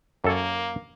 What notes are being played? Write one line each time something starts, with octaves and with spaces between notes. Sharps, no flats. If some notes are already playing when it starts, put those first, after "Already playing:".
F#2 A#3 A4 C#5